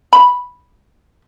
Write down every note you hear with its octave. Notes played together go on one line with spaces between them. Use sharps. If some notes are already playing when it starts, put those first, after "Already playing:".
B5